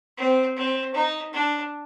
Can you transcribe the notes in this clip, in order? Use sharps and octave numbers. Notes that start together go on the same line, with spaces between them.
C4
C4
D#4
D4